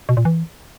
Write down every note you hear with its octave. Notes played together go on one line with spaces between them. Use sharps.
B2
A#2
E3